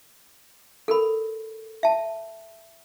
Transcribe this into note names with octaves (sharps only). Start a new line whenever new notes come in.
A4 A#4 B5
E5 A5